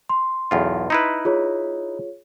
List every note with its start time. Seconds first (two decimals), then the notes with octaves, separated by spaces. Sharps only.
0.09 C6
0.51 B1 E2 F4
0.90 D#4 E4 B4
1.25 F4 G#4 C#5